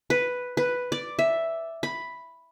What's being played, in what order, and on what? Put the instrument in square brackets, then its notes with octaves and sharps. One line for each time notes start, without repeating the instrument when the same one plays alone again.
[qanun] B4
B4
D5
E5
B5